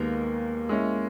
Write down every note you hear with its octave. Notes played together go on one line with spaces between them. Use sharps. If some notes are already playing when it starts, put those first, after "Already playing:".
Already playing: D#2 D#3 G#3 A#3 B3
G#3 C#4 E4